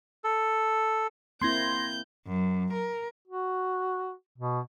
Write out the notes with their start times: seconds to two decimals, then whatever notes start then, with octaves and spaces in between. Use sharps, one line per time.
0.24 A4
1.42 A#3 C4 E4 C6 G6 G#6 A#6
2.28 F#2
2.73 A#4
3.28 F#4
4.38 B2